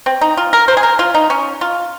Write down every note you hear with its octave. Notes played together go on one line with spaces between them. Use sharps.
C4
D#4
F4
A#4
C5
G#4
A#4
F4
D#4
C#4
F4